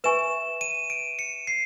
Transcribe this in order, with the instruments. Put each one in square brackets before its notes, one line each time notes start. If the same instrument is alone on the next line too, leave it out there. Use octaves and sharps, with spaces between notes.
[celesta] B4 E5 G#5 C#6 [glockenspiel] E7
[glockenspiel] D#7
D7
C#7
C7